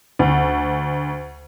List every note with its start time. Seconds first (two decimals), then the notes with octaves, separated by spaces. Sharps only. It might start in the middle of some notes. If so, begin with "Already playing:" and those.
0.19 D2